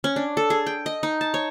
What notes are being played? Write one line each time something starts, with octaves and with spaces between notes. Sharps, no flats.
C#4
D4
A4
G#4
G5
D#5
D#4
A5
C#5